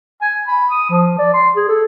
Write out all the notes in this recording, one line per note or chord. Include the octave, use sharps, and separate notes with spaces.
G#5
B5
D#6
F3
D5
C6
G#4
A4